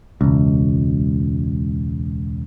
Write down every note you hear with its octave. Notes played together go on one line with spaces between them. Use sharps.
E1 C#2